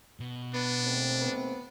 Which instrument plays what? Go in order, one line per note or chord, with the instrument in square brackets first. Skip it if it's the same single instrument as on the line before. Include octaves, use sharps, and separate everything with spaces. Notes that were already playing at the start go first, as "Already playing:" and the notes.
[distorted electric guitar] B2
[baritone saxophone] B3 [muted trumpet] D4
[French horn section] D#2 A3 C4
[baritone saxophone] B3